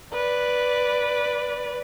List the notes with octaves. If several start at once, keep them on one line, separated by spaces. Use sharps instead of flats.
B4 D5